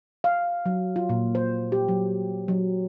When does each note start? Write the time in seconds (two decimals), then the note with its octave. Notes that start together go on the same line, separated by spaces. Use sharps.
0.24 F5
0.66 F#3
0.96 F4
1.09 A#2
1.35 C5
1.72 G4
1.88 F#3
2.48 F#3